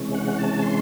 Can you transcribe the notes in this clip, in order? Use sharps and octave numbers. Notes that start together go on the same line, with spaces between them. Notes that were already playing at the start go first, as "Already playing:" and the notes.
Already playing: C3 E3 G#3 C#4
F#5
A5
C6